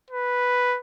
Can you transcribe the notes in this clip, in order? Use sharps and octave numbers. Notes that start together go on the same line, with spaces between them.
B4